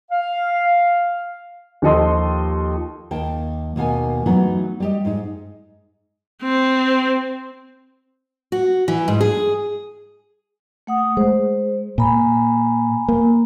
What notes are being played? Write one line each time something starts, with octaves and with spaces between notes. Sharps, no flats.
F5
D#2 F3 A4 D#5 C6
D#2 G5 A5
D#2 B2 A#3 G#5
E3 F#3 A3 B3 D#4 E4
G3 G4 D#5
G#2 D#4
C4
F#4
E3
G#2
G#4
A3 F#5 D#6
G#3 C5
A#2 G#5 A#5 B5
A#3